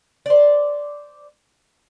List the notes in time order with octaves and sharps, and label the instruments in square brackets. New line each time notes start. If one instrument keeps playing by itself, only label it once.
[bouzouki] C5 D5